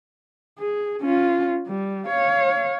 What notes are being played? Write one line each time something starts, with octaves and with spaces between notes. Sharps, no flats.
G#4
C#4 F4
G3
C#5 F5